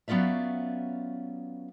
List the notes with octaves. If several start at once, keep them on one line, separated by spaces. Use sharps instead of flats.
F#3 B3 C#4 F4 D5 E5